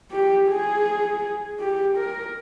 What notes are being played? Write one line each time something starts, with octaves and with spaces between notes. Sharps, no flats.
G4
G#4
G4
A#4